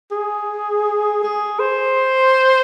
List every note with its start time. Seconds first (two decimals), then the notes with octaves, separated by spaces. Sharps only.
0.12 G#4
1.23 G#4
1.59 C5